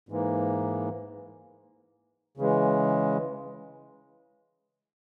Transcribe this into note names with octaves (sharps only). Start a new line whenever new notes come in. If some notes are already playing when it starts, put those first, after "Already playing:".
G#2 E3 A#3
C#3 E3 G#3